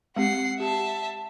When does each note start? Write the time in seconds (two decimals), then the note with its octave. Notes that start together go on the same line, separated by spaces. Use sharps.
0.16 G#3 C4 G4 F#5 C7
0.60 G4 E5 A5